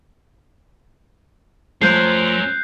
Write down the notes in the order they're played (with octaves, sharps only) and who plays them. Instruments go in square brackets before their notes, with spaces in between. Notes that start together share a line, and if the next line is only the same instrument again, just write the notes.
[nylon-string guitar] F3 [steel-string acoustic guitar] A3 C5 [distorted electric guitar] C#4 A#4 [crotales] F#6 G6 C7